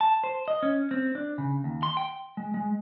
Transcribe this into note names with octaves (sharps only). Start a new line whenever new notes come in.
A5
C5
D#5
C#4
C4
D4
C#3
D#2
C6
G5
G#3
G#3